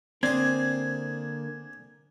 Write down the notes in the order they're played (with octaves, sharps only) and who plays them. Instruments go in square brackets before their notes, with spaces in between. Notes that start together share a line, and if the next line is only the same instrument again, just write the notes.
[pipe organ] D3 A#3 [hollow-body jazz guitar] C4 [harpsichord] D4 G#4 [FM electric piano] G#6